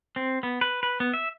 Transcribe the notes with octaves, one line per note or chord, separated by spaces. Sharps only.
C4
B3
B4
B4
B3
E5